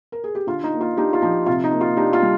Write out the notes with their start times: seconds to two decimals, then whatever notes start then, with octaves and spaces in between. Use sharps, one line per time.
0.12 A#4
0.24 G#4
0.35 G4
0.47 D3 F4
0.64 D#4
0.72 A#3
0.81 F4
0.97 D4 D#4 G4
1.13 F4
1.21 F3 D#4 G4
1.46 C3 F4
1.64 D#4
1.71 A#3
1.81 F4
1.97 D4 D#4 G4
2.13 F4
2.22 G3